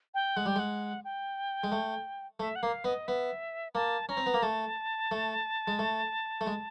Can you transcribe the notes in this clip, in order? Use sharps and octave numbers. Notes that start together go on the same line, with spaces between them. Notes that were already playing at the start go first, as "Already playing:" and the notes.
G5
G#3 F#5
G3 G5
G#3 F#5
G5
G#3
A3
A3 E5
F#5
A#3 F5
B3 D#5
B3 E5
A#3 A5
C#4 A#5
C4
B3
A#3
A3 A5
A3
G#3
A3
A3
G#3